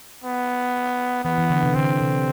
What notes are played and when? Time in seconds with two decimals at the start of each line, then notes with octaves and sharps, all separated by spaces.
0.24 B3
1.24 E3 B3
1.38 E3
1.50 D3
1.63 C3
1.75 D3 C4
2.01 C3